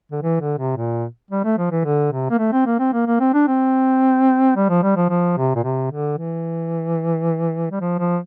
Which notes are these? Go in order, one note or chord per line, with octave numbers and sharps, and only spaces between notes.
D3
E3
D3
C3
A#2
G3
A3
F3
E3
D3
C3
A#3
A3
C4
A#3
C4
A#3
A#3
C4
D4
C4
G3
F3
G3
F3
F3
C3
A#2
C3
D3
E3
G3
F3
F3